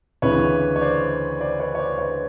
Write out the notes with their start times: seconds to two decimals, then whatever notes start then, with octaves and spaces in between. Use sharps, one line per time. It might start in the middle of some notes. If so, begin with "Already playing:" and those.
0.22 D2 C#3 E3 B4 C#5
0.76 C#5
0.81 C5 D5
1.41 C5 D5
1.59 B4 C#5
1.75 C#5
1.79 C5 D5
1.99 B4 C#5